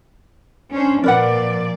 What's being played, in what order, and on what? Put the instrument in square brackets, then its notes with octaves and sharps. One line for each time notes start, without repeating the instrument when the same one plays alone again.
[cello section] C#4 D4 C5
[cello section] A#2 F3 D5 [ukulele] A#4 B4 F#5